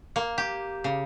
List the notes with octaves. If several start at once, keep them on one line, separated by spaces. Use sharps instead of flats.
A#3
G4
C#3